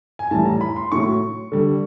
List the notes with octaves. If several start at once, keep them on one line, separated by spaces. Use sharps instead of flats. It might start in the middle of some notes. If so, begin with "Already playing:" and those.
G#5
A2 E3 G3 A5
A#5
B5
C6
A2 F#3 C#6
D3 G3